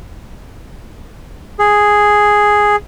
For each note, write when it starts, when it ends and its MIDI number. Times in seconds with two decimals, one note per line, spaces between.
1.59 2.76 68